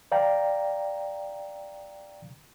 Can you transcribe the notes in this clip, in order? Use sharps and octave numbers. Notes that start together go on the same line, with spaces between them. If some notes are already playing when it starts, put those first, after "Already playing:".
D5 F5 G5 A#5